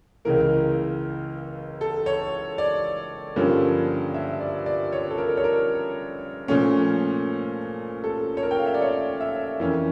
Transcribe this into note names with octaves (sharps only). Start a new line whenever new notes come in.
C#2 C#3 E3 A#3 A#4
A4
C#5
D5
G2 D3 F3 A#3 C#4
E5
D5
D5
C#5
A4
A#4
C#5
A#4
A#2 F3 A3 C#4
A4
C#5
A#4
G5
F5
E5
D5
C#5
E5
F2 E3 A#3 C#4